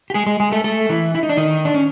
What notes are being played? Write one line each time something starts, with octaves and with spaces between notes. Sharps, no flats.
G4
G#3 G#4
G#3 G#4
G#3 G#4
A3 A4
A3 A4
E3 E4
E4
D#4
D4
D#3 D#4
D4
C#4